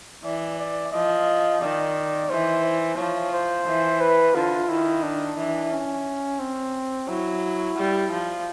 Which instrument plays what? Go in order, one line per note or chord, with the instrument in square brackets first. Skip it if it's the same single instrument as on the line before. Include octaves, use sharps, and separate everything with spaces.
[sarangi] E3 [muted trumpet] D5
[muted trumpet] D5
[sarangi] F3 [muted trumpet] D#5
[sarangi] D#3 [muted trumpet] D5
[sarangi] E3 [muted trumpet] C5
[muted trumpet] C5
[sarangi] F3 [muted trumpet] C#5
[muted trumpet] C5
[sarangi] E3
[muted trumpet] B4
[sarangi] D3 [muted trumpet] F4
[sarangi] D#3 [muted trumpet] E4
[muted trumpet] D4
[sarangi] E3
[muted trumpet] C#4
C4
[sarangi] F#3 [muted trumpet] E4
[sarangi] G3
F3